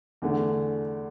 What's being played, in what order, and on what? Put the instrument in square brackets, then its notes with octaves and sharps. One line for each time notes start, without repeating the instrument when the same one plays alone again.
[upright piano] E2 D3 A3